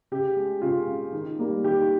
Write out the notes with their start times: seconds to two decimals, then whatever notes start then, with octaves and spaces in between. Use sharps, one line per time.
0.12 C#3 G4
0.36 G#3
0.62 C#3 F4
0.88 G#3
1.13 D#3
1.39 G3 A#3
1.64 D#3 G4